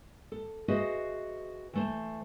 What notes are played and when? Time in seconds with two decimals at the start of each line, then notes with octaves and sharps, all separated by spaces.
0.32 A4
0.68 F#4 G#4 B4 C5 D#5 E5
1.73 E3 A3 C5